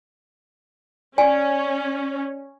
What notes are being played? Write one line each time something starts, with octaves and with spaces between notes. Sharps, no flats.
C#4 D5 G#5